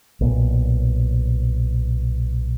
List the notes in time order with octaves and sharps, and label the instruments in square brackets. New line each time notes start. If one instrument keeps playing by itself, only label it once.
[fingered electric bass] B1 A#2